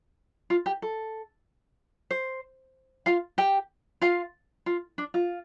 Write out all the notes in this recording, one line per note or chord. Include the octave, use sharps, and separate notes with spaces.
F4
G4
A4
C5
F4 F5
G4 G5
F4 F5
F4
D4
F4